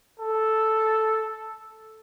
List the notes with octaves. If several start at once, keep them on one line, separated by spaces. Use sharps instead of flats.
A4